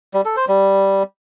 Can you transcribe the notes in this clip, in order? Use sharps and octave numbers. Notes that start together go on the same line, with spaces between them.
G3
A4
C5
G3